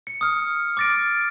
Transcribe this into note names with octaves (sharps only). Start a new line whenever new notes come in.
C#7
D#6 F6
D6 F6 A6 A#6 D7